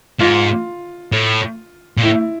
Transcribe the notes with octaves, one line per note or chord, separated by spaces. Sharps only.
G#2 F4
A2
A#2
A2 E4